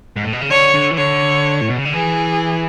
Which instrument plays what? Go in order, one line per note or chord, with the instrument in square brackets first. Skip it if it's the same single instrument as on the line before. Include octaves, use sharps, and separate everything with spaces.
[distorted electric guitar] G#2
A2
B2
C#3
[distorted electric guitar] D3 [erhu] C#5
[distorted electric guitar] D3
E3
[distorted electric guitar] D3 [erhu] C#5
[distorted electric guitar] A2
B2
C#3
D3
[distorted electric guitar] E3 [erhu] G#4